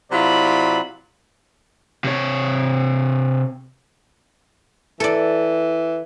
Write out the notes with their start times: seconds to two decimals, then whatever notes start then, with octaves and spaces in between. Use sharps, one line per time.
0.12 C3 F#3 E4 F4 D5 B5
2.04 C3 C#5
5.00 E3 A4 D5